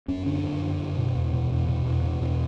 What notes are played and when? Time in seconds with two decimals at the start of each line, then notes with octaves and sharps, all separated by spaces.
0.08 F#2 C#4
0.26 D3 D4
0.43 F#2
0.62 D3
0.79 F#2
0.97 B2
1.15 E2
1.33 B2
1.50 E2
1.68 B2
1.86 E2
2.04 B2
2.22 E2